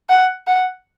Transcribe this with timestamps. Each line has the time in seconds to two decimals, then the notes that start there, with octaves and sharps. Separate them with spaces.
0.09 F#5
0.47 F#5